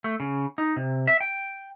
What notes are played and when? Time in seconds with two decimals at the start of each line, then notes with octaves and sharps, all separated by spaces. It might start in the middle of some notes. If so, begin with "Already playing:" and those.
0.04 A3
0.20 C#3
0.58 D#4
0.76 C3
1.07 E5
1.21 G5